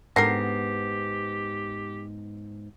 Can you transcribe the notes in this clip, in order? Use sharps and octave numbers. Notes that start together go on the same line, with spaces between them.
G#2 D3 B3 C4 G4 A#4 A#6 C7